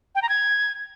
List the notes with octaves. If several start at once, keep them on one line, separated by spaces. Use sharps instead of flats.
G5
A#5
G#6